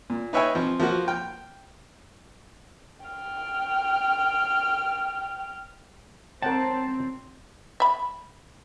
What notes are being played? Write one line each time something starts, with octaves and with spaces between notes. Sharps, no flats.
A#2
D#4 B4 C#5 E5 G5 G#5
F3 C4
F3 A#3 F#4
G5 F6
G5 F6
C4 A#4 C5 C#5 F#5 G5 A5
E5 B5